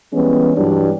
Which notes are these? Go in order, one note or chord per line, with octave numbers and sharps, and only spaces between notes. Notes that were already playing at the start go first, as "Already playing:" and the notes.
E3 G3 G#3 B3 C#4
G2 E3 F#3 G3 D4